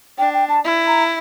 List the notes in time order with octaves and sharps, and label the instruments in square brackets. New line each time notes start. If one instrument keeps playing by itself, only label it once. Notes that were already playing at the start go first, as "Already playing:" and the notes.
[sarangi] D4 [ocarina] G5
[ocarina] G5
A5
[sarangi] E4
[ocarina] A#5